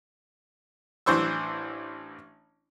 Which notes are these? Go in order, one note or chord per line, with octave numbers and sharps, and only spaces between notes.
A1 E3 D4 C5 C#6 E6